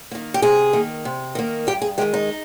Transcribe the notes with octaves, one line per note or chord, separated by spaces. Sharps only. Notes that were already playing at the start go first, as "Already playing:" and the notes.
D#3 A#3
G4
C3 G#4
D#3 A#3
C3
D#3 A#3
G2 G4
G#4
D#3 G#3 G4
D#4